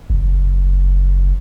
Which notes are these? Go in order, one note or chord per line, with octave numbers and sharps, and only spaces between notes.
F#1